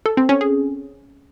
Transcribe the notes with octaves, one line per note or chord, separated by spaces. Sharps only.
A4
C4
C#4
G#4